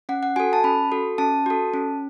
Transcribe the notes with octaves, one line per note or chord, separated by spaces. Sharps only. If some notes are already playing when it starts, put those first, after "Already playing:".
C#4 F#5
F#5
F#4 A4 G#5
A5
C#4 B5
F#4 A4
C#4 A5
F#4 A4
C#4